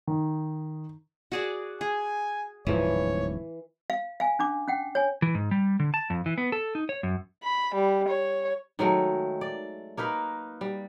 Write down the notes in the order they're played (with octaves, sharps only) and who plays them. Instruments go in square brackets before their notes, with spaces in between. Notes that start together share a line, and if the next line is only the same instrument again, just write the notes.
[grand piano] D#3
[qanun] F#4 G#4 D5
[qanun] G#4 [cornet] G#5
[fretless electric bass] D1 G#2 F3 [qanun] E3 [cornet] C#5
[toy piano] F5
F5 G#5
C#4 D4 D6
C#4 F#5 G5
C#5 G#5
[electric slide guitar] E3
G#2
G3
D3
A5
F2
E3
B3
A4
D#4
C#5
F#2
[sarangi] B5
G3
C#5
[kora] D#3 F#3 G#3 A3
D5
A#3 D#4 A#4 B4
G3